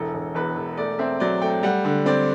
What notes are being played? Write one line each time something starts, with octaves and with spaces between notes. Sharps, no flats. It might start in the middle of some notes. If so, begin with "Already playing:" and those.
Already playing: E1 E3 A4
E1
E2 B4
E1
A3 D5
C4 E5
F#3 D5
A3 G5
G3 F#5
D3
C4 D5